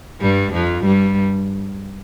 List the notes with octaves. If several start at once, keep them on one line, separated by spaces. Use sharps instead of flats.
G2 G3
F2 F3
G2 G3